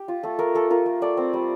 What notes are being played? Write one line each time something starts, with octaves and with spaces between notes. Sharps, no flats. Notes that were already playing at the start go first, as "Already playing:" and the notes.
Already playing: G4
F4
A3 A4
A3 A#4
A3 A4
F4 A#4
A3
A3 D5
C4
G3